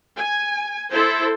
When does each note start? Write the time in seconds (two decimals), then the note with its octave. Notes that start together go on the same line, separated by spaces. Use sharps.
0.17 G#5
0.91 E4 A4 C5